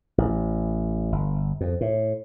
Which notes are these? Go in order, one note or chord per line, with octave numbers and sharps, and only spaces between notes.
A1
G1
F2
A2